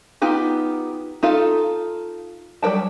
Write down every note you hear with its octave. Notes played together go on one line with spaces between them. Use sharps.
B3 D#4 F4 G4
D#4 F4 A4 F5
F#3 G3 A#4 G5 A5